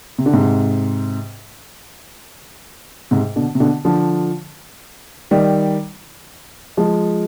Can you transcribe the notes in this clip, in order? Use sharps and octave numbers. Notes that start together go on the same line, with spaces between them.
C3
D3
G#2 C3
G#2 C3
B2 D3
C3
B2 D3
D3 F3
D#3 G3
F3 G#3